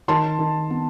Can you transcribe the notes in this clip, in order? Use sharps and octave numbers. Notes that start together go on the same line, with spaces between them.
D#3 A5 C6
D#3
B3